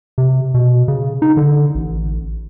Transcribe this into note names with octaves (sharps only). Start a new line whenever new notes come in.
C3
B2
C#3
D#4
D3
A1